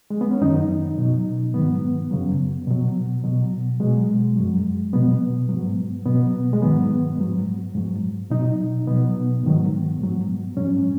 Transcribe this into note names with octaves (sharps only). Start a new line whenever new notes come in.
G#3
B3
C#4
F#2 D#3 F#3 D#4
B2 F#3
G#2 D#3 F#3 B3
F#2 C#3 F#3
B2 F#3
B2 F#3
B2 F#3 G#3
F#2 F#3
B2 F#3 B3
G#2 F#3
B2 F#3 B3
G#3
G#2 D#3 F#3 B3
G#2 F#3
G#2 F#3
B2 F#3 D#4
B2 F#3 B3
G#2 D#3 F#3
G#2 F#3
G#2 F#3 C#4